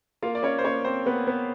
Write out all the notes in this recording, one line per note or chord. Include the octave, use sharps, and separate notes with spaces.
A#3 F4 F5
D5
C#4 C#5
C5
A#3 C#4 C#5
C4 C5
A#3 B3 B4
B3 B4